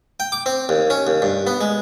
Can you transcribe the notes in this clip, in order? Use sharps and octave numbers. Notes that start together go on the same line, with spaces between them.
G5
D6
C4
D#2
C#4
D#2
G2
B3
G#3